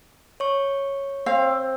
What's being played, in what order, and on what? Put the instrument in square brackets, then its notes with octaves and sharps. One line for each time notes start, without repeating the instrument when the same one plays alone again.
[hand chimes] C#5 C#6
[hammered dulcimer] C4 [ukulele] F5